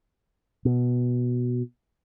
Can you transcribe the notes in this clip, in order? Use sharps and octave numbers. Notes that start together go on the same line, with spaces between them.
B2